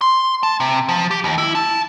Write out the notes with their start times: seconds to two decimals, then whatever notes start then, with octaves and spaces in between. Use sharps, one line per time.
0.01 C6
0.43 A5
0.60 C3
0.89 F3
1.11 G4
1.24 D#2
1.38 E4
1.55 A5